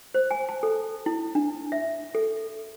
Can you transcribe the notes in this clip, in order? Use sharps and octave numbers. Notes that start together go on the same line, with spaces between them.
C5
G#5
A5
A4
E4
D4
E5
A4